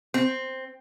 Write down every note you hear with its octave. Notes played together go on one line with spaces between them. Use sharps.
C4